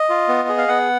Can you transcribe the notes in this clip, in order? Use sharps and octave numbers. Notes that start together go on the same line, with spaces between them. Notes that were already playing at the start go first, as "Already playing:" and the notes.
Already playing: D#5
F4
B3
G#4
F5
B3 F#5